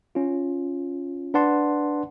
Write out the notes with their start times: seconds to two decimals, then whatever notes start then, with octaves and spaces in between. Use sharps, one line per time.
0.15 C#4 F4
1.34 D4 B4 D5 F#5 A5 C6